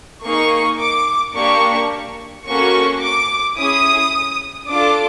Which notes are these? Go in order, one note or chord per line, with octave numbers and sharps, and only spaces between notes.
A#3 D#4 G#4 C#6
D6
A#3 D4 G4 C#6
A#3 C#4 F#4 A4 C#6
D6
C#4 E4 G#4 D#6
D4 F4 A4 D6